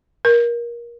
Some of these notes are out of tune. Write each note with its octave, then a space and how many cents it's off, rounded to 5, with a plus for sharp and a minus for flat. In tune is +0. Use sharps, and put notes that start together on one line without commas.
A#4 +25